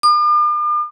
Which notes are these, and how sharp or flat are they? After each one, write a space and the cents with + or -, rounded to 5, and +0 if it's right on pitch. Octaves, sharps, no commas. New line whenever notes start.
D6 +45